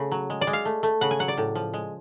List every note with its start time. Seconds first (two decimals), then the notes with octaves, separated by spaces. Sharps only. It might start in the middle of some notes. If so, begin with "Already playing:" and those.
Already playing: C#3 A3
0.12 F#3
0.30 G#3
0.41 D5
0.47 G#3
0.53 F5
0.65 A3
0.83 A3
1.01 C#3 F#5
1.11 G#5
1.19 F#3 F#5
1.28 D5
1.38 A2
1.55 F3
1.74 G#3